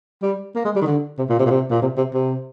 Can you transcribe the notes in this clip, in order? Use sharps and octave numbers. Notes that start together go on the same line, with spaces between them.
G3
A#3
G#3
G3
D#3
D3
C3
A#2
C3
A#2
C3
A#2
C3
C3
C3